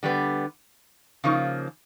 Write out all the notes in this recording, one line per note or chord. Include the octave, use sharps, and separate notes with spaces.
D3 G3 B3
C#3 F3 A#3 D#4